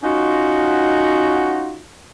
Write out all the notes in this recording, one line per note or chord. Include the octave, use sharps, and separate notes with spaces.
C#4 D#4 F4 F#4